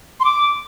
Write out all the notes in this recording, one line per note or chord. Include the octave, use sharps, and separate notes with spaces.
C6
D6